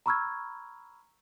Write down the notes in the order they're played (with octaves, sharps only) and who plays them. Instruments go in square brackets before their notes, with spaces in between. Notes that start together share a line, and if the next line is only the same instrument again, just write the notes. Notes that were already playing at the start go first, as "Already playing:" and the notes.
[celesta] A#5 B5 C#6 E6 F6 G#6